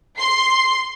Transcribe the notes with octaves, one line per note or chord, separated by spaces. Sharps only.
C6 C7